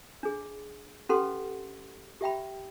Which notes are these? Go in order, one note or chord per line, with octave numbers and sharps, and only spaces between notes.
D4 G#4
C#4 G4 A4 B4 F#5 C6
G4 E5 G5 B5